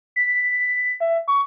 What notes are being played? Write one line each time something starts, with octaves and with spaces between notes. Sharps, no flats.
B6
E5
C#6